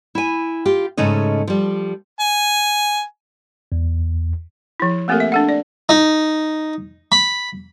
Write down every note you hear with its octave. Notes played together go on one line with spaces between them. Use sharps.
E4 G#5
F4 G4
G#2 C#3 A3 C#4 D#5
F3 G3
G#5
E2
F3 E4
A3 A#3 C4 G4 A4 A#4
E5
D4 A4 F#5
D5
D#4
B5